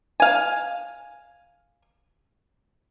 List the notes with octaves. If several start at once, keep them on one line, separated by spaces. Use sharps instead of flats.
F5 G#5